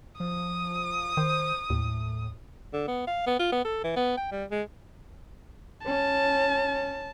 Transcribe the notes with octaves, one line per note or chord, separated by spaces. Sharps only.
F3 D#6
D#3 C5
D#2 A2
D3
B3
F5
B3
F4
B3
A4
E3
B3
G5
G3
G#3
C#4 A5